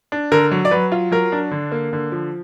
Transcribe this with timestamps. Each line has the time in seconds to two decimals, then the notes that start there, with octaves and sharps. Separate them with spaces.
0.12 D4
0.32 D3 A#4
0.51 F#3
0.65 D5
0.71 F#3 B4
0.92 F4
1.12 F#3 A#4
1.32 D4
1.51 D3
1.72 A#3
1.93 D3
2.12 F3